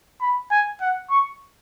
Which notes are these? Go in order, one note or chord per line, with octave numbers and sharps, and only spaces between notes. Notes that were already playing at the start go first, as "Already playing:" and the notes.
B5
G#5
F#5
C#6